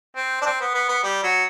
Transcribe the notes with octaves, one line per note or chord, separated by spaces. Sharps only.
C4
D4
C4
B3
B3
B3
G3
F#3